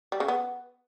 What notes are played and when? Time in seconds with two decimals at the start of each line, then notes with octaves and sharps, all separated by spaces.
0.12 G3
0.20 C#3
0.28 B3